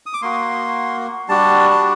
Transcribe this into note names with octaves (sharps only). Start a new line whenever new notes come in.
D#6
D6
A#3 F#4 C6
G3 D4 F#4 A5
A5